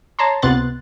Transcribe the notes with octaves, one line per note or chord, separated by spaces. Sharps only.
C#5 A5 A#5 C6
C#2 C3 B3 C6 F#6 A6